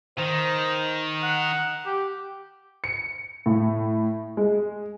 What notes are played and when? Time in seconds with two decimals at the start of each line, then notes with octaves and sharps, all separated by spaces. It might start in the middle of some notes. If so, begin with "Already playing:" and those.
0.18 D#3 C5
1.23 F#5
1.86 G4
2.84 C#7
3.46 A2
4.37 G#3